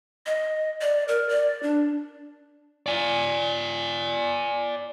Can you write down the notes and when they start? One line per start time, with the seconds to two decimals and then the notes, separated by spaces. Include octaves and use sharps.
0.26 D#5
0.81 D5
1.08 A#4
1.29 D5
1.63 D4
2.86 D5 G#5